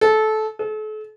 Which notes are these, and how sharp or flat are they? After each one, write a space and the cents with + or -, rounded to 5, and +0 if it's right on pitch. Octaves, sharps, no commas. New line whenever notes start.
A4 -20
A4 -40